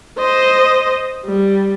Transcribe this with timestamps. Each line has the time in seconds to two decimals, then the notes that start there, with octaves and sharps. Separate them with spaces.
0.18 C5 D#5
1.25 G3